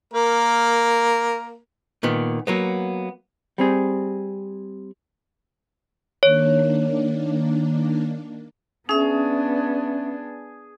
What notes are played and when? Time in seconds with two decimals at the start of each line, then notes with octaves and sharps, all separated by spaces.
0.13 A#3 A#4
2.03 A#2 D#3 B3
2.47 F#3 A#3 B3
3.58 G3 C4 G#4
6.23 D#3 A#3 D4 C#5
8.89 B3 C#4 D4 G#4 E5